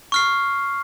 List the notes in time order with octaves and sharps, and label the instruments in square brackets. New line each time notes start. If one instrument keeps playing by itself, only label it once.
[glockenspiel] C#6 F6 C7